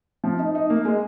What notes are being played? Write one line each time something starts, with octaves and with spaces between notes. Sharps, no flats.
F3
D#4
D#4
A#3
G#3